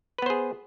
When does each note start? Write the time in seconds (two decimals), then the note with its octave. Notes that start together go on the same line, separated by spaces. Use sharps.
0.18 B4
0.22 B3
0.26 C5
0.30 G#4